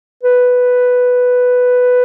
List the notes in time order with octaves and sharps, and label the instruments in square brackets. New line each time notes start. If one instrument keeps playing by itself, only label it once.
[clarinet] B4